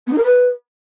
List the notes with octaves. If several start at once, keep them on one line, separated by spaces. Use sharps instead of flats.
B3
D#4
A#4
B4